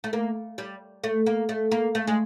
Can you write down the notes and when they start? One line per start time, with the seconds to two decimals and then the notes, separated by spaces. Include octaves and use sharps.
0.04 A3
0.13 A#3
0.58 G3
1.04 A3
1.26 A#3
1.49 A3
1.71 A#3
1.95 A3
2.07 G#3